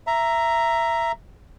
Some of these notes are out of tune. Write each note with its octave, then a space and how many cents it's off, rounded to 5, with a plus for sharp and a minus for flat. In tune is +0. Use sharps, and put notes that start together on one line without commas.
E5 +15 A#5 +0